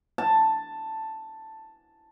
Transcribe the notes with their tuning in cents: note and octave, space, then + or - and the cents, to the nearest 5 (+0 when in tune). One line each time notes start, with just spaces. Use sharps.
A5 +5